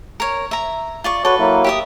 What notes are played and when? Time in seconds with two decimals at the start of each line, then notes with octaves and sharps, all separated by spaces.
0.20 A#4 C#5
0.51 E5 A#5
1.04 F4 D5 C#6
1.25 F#4 A4 B4 C#5
1.39 F#3 A#3 E4
1.64 G4 E5 D#6